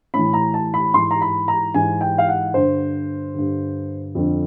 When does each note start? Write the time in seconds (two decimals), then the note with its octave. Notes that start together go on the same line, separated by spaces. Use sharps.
0.14 A2 E3 B5
0.33 A#5
0.54 A5
0.74 B5
0.94 G#2 E3 C6
1.11 A#5
1.22 B5
1.48 A#5
1.74 G#2 E3 G#5
2.01 G5
2.18 F5
2.29 F#5
2.54 G2 D3 C5
3.35 G2 D3
4.15 F2 D3